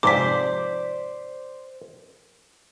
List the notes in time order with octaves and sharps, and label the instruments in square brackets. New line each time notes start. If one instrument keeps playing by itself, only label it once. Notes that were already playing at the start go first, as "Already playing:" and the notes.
[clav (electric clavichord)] F2 G#2 C3 [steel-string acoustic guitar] C5 D5 [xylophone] D6 B6